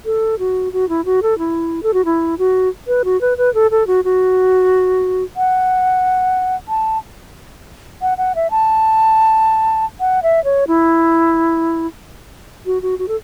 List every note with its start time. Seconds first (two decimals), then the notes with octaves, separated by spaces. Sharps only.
0.05 A4
0.39 F#4
0.73 F#4
0.89 E4
1.05 F#4
1.23 A4
1.39 E4
1.83 A4
1.94 F#4
2.05 E4
2.39 F#4
2.87 B4
3.05 F#4
3.21 B4
3.38 B4
3.54 A4
3.71 A4
3.87 F#4
4.04 F#4
5.36 F#5
6.69 A5
8.02 F#5
8.18 F#5
8.35 E5
8.51 A5
10.00 F#5
10.23 E5
10.44 C#5
10.68 E4
12.66 F#4
12.82 F#4
12.99 F#4
13.08 A4